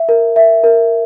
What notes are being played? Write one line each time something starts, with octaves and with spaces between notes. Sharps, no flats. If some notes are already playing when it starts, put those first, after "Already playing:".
Already playing: E5
A#4
E5
A#4